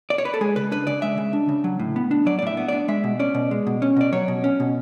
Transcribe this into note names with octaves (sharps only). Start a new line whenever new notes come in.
D5
C#5
B4
A4
G#3 G#4
C#3 B4
D4 B4
C#3 D5
G#3 E5
C#3
D4
C#3
F#3
A2
B3
D4
F#3 D5
D5
A2 E5
B3
D4 D5
G#3 E5
B2
C#4 D5
B2
G#3
B2
C#4
B2 D5
F#3 C#5
B2
C#4
B2